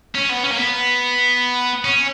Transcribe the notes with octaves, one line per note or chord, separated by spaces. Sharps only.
C#4
B3
C#4
A#3
B3
C#4